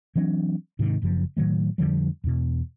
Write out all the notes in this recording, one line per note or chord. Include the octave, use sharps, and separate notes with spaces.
E3 F#3 C4 D4
G#2 C3 D#3
F#1 F#2 C#3 F3
A2 D#3 F#3 A3
F2 D3 F3 G3
E2 B2